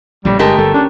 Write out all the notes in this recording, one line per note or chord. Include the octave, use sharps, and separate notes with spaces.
A#1 A2 C#3 G3
G1 G#3 A3 G4 A#4
G1 G3 A4
C#4 D4